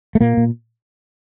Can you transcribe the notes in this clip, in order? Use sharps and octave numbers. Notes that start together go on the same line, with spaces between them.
A3
A#2 A#3
A#2